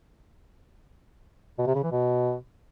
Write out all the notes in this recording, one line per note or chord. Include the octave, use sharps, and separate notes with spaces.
B2
C3
C#3
E3
B2